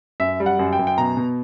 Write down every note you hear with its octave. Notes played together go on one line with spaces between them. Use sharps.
F#2 E5
G3
F#5
F#2
G5
F#2
G5
B2 A#5
B2